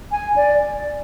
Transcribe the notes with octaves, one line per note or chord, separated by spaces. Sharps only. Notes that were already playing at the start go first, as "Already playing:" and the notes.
G#5
D5